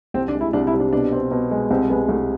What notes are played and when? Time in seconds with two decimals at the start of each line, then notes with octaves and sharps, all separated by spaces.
0.14 C2 C4
0.28 D4
0.35 G#3
0.41 E4
0.53 C2 D4
0.67 E4
0.73 C3
0.80 D4
0.93 B2 D4
1.12 C4
1.31 B2
1.51 G#3
1.71 C2 C4
1.90 G#3 B3
2.09 C2 A3